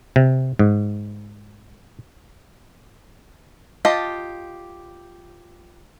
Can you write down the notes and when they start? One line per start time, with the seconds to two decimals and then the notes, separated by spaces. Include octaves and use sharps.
0.16 C3
0.59 G#2
3.85 F4 G4 D#5 A5